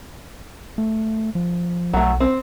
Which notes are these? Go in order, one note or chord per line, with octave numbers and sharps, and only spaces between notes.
A3
F3
B1 F#3 A3
C4